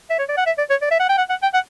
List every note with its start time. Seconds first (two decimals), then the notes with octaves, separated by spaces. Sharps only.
0.10 E5
0.19 C#5
0.29 D5
0.37 F#5
0.46 E5
0.58 D5
0.70 C#5
0.82 D5
0.91 E5
1.00 F#5
1.09 G5
1.18 F#5
1.29 F#5
1.42 G5
1.54 F#5